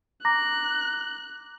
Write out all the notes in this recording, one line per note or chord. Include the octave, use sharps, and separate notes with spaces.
A#5 D6 F#6 A#6